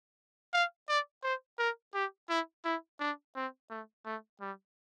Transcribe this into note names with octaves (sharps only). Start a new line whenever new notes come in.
F5
D5
C5
A#4
G4
E4
E4
D4
C4
A3
A3
G3